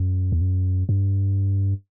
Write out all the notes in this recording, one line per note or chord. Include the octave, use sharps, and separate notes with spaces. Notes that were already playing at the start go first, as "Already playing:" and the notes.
Already playing: F#2
E2
F#2
G2